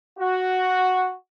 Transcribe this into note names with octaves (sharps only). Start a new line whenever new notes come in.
F#4